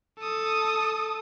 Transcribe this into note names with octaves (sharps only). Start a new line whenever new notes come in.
A4 D#6